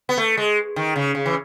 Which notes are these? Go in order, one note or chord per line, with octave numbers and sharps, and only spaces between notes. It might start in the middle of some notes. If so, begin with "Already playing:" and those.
B3
A3
G#3
D#3
C#3
C#3
E3